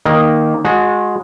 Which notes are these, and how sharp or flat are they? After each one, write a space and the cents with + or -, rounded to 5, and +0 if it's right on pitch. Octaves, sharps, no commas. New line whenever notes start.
D#3 +0 A#3 +0 D#5 +0
G#3 +0 F#4 -30